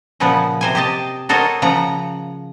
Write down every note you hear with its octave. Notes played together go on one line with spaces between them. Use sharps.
A#2 C#3 F3 B3 F#5
C3 C5 G#5
G4 C5 D#5 A5
F#4 A4 A#4 C5 C#5 D#5
C#3 F3 F#5 A#5